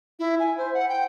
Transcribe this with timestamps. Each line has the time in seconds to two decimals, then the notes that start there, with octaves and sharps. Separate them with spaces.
0.19 E4
0.40 G#5
0.58 C5
0.74 F#5
0.89 G5